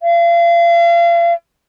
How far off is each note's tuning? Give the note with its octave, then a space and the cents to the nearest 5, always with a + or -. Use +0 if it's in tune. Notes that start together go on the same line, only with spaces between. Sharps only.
F5 -35